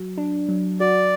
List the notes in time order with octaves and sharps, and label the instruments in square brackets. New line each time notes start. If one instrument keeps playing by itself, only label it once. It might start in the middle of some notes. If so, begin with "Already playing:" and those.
Already playing: [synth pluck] F#3
D4
F#3
[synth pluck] F#4 [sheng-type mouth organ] D5